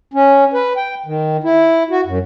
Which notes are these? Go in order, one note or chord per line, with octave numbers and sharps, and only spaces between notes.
C#4
B4
G5
D#3
E4
F#4
F#2